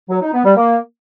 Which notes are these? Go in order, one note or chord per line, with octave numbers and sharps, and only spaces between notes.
F#3
D#4
B3
G3
A#3